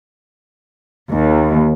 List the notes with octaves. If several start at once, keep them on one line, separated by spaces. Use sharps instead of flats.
D#2